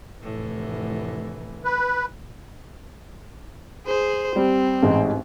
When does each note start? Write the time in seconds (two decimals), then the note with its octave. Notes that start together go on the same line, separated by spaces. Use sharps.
0.22 F1 A2 E3
1.65 B4
3.87 G#4 C5
4.36 G3 C4
4.83 A1 G#2 D#4